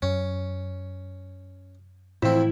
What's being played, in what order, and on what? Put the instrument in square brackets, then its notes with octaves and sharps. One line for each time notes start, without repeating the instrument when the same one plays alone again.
[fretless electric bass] F#2 [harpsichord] C#4
[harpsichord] F2 C4 [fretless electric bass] A2 E3 A3 [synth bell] E4